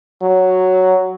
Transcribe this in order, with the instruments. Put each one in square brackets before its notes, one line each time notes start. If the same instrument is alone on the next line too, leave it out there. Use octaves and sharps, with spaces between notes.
[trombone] F#3